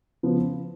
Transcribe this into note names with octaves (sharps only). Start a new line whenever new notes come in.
C#3 F3 B3 F4 B4